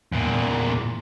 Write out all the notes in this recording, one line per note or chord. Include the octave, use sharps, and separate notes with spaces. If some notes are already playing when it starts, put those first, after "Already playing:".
E2 A#2